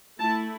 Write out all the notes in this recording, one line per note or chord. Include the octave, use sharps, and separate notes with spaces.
A3 E4 A5